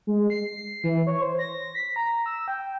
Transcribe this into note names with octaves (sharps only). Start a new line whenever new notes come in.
G#3
C7
E3
C#5
C5
A#6
B6
A#5
E6
G5